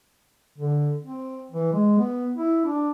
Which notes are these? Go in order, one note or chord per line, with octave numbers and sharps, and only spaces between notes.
D3
C4
E3
G#3
B3
E4
D4